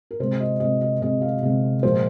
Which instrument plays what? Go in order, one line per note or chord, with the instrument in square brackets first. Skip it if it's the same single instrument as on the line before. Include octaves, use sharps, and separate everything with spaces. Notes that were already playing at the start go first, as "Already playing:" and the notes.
[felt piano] A#4
C3 G#3 C5
D#5
C3 G#3 D#5
D#5
C3 G#3 D#5
F5
C3 G#3
A#2 F3 G#3 C5